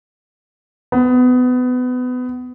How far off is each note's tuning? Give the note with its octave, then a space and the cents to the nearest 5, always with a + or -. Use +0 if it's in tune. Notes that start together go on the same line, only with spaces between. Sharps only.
B3 +25